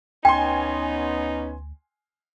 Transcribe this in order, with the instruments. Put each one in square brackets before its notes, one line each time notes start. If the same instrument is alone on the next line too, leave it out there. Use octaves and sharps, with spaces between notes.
[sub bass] D2 [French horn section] B3 C#4 D#4 [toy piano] G5 [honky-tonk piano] G#5 C6